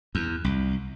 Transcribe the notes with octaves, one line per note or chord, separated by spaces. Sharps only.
E2
C2